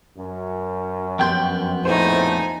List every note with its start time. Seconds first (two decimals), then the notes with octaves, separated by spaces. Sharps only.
0.18 F#2
1.19 F2 B3 G5 C6 G6
1.85 A#1 A2 A3 D#4 C5 G#5